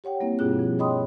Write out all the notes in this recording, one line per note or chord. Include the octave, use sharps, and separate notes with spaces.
G4 C#5 F#5 G5
G3 A#3 C4 E4
G2 B2 D4 F4 G#4 F#6
F3
C#5 D#5 G5 B5 C6 D#6